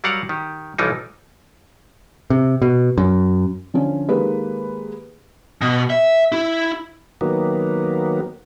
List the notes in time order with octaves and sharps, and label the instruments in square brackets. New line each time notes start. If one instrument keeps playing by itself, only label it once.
[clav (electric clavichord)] F#3 G3 A#4 F5 F#5
D#3 G4
B1 E3 F3 G3 D#4
[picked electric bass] C3
B2
F#2
[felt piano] D3 F3 C#4
D#3 G#3 A#3 G4 B4
[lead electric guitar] B2
E5
E4
[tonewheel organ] D#3 F#3 A#3 B3